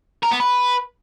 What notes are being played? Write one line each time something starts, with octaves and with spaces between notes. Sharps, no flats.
A#4
B3
B4